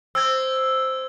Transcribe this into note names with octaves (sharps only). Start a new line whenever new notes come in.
C4 E6 G#6